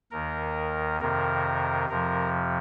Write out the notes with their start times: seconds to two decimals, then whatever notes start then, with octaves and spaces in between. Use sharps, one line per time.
0.11 D#2 D#3 A#4
1.01 F2 C3 D#3 A#4
1.89 F2 C3 F3 A#4